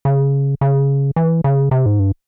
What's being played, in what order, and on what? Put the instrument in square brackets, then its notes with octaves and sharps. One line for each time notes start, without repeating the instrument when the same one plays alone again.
[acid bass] C#3
C#3
E3
C#3
C3
G#2
G2